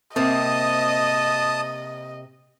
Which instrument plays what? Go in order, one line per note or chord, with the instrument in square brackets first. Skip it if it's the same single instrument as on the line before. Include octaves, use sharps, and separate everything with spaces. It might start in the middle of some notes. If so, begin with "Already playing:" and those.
[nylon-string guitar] C3 A#3 C4 [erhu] D#5 [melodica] A5 D#6